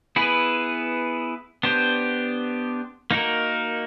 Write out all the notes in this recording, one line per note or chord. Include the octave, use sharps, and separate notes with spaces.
B3 E4 G#4 B4
B3 D4 G4 C5
A#3 D#4 F#4 A#4